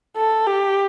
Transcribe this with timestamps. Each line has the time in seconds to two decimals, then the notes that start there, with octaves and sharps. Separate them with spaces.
0.16 A4
0.47 G4